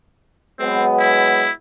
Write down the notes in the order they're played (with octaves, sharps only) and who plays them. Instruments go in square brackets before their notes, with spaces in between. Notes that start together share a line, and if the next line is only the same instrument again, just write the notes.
[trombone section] F#3 G#3 B3 [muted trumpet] C4
[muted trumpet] E4